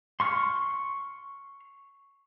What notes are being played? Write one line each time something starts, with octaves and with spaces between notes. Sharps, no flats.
C6 C#6 F6